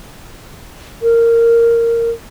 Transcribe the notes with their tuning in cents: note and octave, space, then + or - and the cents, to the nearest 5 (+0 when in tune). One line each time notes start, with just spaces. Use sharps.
A#4 -10